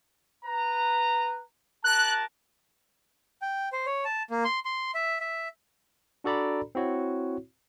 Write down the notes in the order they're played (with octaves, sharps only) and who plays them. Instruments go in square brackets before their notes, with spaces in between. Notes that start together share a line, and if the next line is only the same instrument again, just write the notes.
[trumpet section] B4 A#5
[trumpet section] G4 A#4 A5 [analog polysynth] F#6
[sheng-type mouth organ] G5
C5
C#5
A5
A#3
C6
C6
E5
E5
[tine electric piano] D4 F#4 A4 D5 A#5 B5
C4 E4 F#4 C#5